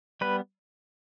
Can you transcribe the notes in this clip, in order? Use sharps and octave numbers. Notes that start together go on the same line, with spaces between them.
G3 B3 B4